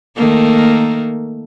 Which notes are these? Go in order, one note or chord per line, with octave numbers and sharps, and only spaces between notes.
D#3 A3 A#3